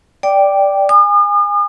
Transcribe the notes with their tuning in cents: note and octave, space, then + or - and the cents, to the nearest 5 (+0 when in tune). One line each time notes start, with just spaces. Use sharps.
D5 -5 G5 +0 D6 +5
G#5 -25 D#6 -45